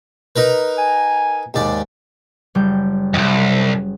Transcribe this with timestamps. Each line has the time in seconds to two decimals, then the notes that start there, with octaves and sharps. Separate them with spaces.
0.36 D#4 A#4 B4
0.78 G#5
1.54 D#2 G#2 D5
2.55 F#1 G3 G6
3.14 C2 F2